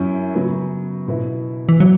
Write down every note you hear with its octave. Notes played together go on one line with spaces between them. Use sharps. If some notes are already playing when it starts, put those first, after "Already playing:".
Already playing: F#2 F#3 C#4 E4
C#3 F#3 B3
B2 B3 E4
E3
F#3 E4